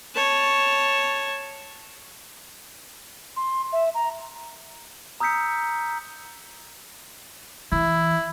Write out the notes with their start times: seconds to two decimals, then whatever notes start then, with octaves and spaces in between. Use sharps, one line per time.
0.15 C#5 A5
3.37 C6
3.73 E5
3.94 A#5
5.20 A#5 D#6 E6 G6 B6 C#7
7.72 E3 E4